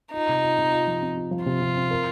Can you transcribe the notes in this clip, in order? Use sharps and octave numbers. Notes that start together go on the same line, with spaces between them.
D#4 F4
C3
F4
C3
F4
F3
C4
F4
F3
C3 F4
C3
C4
A#4